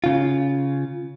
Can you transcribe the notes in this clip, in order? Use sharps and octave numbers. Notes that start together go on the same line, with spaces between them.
C#3 F4